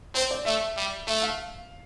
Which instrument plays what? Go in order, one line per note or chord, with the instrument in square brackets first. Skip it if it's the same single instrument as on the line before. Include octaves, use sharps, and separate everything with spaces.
[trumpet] C4 [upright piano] C5
[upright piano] D5
[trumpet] A3 [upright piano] E5
[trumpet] G3
[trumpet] A3 [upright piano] E5
[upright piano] F5